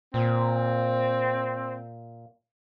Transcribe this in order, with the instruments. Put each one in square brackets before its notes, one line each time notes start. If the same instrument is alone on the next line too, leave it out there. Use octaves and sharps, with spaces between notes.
[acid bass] A#2 [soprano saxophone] C4